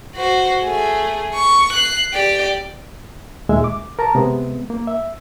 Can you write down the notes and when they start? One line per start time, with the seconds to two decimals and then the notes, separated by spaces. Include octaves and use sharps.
0.16 F#4 C5
0.63 A3 G#4
1.35 C#6
1.73 F#6 C7
2.13 G4 D5
3.49 D#2 A#2 G#3 E5
3.64 D6
3.99 A#4 A5 A#5
4.15 C3 G#3 B3
4.70 A#3
4.87 E5